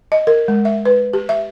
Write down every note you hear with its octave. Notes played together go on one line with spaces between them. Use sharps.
D#5
A#4
G#3
E5
B4
G4
E5